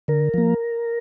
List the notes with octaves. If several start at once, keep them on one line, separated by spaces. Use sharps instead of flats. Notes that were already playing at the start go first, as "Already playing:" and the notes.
D3 A#4
F3 A#3